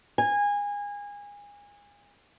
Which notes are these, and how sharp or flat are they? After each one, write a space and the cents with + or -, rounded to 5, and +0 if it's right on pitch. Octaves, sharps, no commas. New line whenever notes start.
G#5 -25